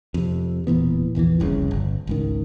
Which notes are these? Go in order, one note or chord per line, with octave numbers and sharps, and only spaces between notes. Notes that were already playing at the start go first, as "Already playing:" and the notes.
F2 C3
E1 A#2 E3 B3
A#1 E2 D3 E3
F1 C2 A#2 C#3
G1
G#1 C#2 D#3